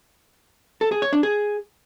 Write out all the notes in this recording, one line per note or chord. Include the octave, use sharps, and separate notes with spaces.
A4
G#4
C#5
D4
G#4